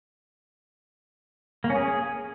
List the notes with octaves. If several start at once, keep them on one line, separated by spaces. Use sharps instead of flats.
A#3
C#4
G#4